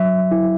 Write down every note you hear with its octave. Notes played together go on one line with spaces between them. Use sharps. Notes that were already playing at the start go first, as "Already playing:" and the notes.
Already playing: F#3 E5
E4